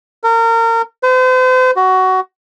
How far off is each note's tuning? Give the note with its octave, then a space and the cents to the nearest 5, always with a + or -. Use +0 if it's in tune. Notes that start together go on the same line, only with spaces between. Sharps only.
A#4 -30
C5 -40
F#4 +15